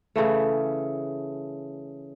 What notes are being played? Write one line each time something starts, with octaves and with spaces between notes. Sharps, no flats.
C#3 E3 A3